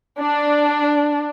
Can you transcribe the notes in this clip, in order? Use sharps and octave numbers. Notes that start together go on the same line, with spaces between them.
D4